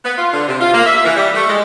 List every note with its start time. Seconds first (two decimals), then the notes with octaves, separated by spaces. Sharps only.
0.04 B3
0.18 F4
0.33 D3
0.48 C3
0.61 F4
0.73 A#3
0.86 E5
1.05 E3
1.16 G3
1.35 A3
1.48 G#3